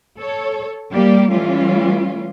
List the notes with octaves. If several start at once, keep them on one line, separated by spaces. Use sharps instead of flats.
A4 C#5
G3 A#3 G4 D5
E3 G3 A3 C#4 F4